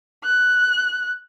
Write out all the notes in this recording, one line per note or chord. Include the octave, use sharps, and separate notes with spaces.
F#6